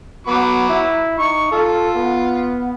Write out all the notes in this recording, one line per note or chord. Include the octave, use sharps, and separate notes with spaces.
F#3 B3 B5 D6
E4
D#4 C#6
F4 A4
B3